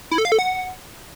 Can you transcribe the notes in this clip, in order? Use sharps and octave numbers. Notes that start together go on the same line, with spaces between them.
E4
A4
F5
A4
F#5